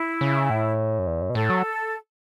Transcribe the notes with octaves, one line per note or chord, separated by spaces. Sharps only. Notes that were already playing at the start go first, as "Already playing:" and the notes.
Already playing: E4
C#3
A2
F#2
E2
F#2
B2
A2 A4
F#3